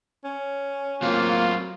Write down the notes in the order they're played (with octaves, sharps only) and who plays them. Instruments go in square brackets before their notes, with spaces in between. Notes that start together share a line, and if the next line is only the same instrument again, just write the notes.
[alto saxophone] C#4
[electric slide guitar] F#3 C4 [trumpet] A#3 [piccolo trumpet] F4